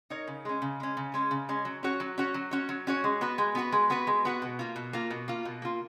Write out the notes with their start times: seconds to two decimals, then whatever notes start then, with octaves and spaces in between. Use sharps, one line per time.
0.10 D#4 A#4 C#5
0.27 C#3
0.45 G#3 C#4
0.62 C#3
0.80 G#3 C#4
0.97 C#3
1.14 G#3 C#4
1.31 C#3
1.49 G#3 C#4
1.65 F#3
1.83 C#4 F#4 C#5
2.00 F#3
2.18 C#4 F#4 C#5
2.34 F#3
2.51 C#4 F#4 C#5
2.69 F#3
2.87 C#4 F#4 C#5
3.04 G#3
3.21 B3 F#4 B4
3.38 G#3
3.55 B3 F#4 B4
3.72 G#3
3.90 B3 F#4 B4
4.07 G#3
4.25 B3 F#4 B4
4.42 B2
4.59 A#3 F4
4.76 B2
4.93 A#3 F4
5.11 B2
5.28 A#3 F4
5.45 B2
5.62 A#3 F4